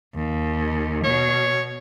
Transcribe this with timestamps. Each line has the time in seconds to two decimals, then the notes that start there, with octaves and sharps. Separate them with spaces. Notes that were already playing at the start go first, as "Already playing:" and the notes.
0.15 D#2
1.04 B2 C#5